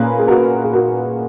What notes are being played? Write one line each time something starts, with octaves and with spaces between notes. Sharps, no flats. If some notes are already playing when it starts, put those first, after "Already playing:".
Already playing: A#2 A#3 C#4 G#4 B4
G#4
F#4 A#4
G#4
F#4 A#4